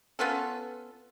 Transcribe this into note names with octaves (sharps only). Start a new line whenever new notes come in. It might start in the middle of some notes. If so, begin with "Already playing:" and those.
B3 C#4 F4 A4